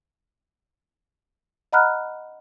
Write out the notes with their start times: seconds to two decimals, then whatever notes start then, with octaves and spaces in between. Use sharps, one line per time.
1.73 D#5 F#5 A#5 B5 F6 F#6